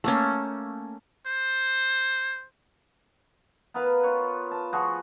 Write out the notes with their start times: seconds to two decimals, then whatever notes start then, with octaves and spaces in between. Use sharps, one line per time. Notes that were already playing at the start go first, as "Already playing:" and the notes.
0.04 A3 A#3 C#4
1.27 C5
3.74 B3 A#4 B4 F5
4.03 F4 C#5
4.51 A5
4.73 F3 F#4 G#4 C#6